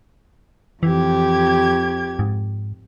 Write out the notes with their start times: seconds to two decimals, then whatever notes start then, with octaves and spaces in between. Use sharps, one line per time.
0.83 F2 E3 G4 G#6
2.19 G#2